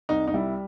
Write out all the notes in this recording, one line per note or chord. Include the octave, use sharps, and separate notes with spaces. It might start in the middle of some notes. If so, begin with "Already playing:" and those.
C2 D#4
D#4
G3 E4